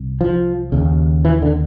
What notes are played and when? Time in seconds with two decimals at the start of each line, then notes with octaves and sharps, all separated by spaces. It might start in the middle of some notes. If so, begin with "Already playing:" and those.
Already playing: C2
0.21 F3
0.72 D#2 C#3
1.25 E3
1.42 D3